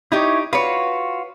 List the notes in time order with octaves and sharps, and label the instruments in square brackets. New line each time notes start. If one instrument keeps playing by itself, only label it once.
[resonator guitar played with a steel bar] D#4 G4 [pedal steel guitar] E4 C#5
[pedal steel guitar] F4 F#4 [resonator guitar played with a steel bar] B4 C#5